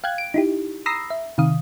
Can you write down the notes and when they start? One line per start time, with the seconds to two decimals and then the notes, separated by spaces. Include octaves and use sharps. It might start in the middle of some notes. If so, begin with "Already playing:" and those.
0.04 F5 G5 F#6 G#6
0.18 D7
0.34 D#4 E4 G4
0.86 A#5 B5 D#6 E6 A#6 C7
1.10 E5
1.38 C3 D#3 F5 D#6